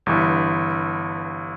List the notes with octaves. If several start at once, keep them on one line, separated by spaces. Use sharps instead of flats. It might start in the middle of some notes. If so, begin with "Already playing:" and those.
G1 G2 E3